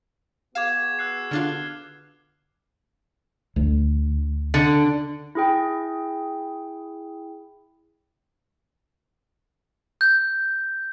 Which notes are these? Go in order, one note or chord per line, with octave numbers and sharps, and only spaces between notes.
B3 F#4 G#4 F5 D6 G#6 E7
E6 F#6 C7
D3 D4 F4 F6
D2
D3
E4 G#4 G5
G6